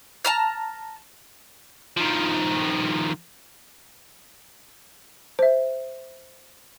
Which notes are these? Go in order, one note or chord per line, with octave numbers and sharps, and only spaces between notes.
A5 A#5 F6
D#3 F3
C5 E5